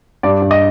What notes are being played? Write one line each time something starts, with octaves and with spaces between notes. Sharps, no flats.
G2 D5
G2
D#5